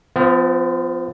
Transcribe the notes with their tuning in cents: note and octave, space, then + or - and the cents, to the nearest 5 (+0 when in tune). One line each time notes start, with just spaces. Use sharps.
F3 +0 B3 +45